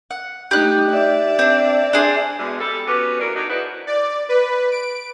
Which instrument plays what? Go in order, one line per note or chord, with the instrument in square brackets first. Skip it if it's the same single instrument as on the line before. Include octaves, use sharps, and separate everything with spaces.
[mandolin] F#5
[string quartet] A3 D#4 [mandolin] G4 F#6
[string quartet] D5 E5
[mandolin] C4 D4
D4 G#4 C5
[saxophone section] B2 D3 G#3
G3 A4
B3 C#4 F#4 G4 B4
E3 F#3 D4 A#4
F#3 D4 D#4
E4 F#4 G#4 B4 C5 D5
[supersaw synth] D5
B4
D7